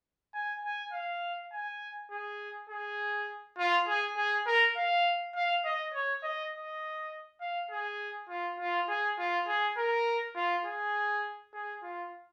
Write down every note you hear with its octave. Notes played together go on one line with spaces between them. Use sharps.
G#5
G#5
F5
G#5
G#4
G#4
F4
G#4
G#4
A#4
F5
F5
D#5
C#5
D#5
D#5
F5
G#4
F4
F4
G#4
F4
G#4
A#4
F4
G#4
G#4
F4